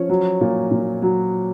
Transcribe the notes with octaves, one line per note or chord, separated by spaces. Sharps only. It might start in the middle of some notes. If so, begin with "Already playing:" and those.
Already playing: F3 C#4 C#5
F#3
A#2
A#2
F#3